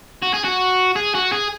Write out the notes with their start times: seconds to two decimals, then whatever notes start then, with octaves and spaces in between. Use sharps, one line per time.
0.22 F#4
0.33 G#4
0.44 F#4
0.96 G#4
1.14 F#4
1.32 G#4